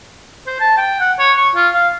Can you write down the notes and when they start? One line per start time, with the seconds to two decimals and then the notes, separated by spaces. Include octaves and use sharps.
0.47 C5
0.60 A5
0.77 G5
1.00 F#5
1.19 C#5
1.37 C#6
1.55 F4
1.74 F5